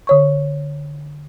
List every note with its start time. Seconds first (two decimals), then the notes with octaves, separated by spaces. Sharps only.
0.07 D3 C#5 C#6